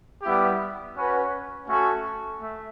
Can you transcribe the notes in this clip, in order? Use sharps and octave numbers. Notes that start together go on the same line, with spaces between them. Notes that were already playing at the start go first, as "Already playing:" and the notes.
G3 B3 E4 G4
C#4 F#4 B4
A3 C#4 F#4 A4
A3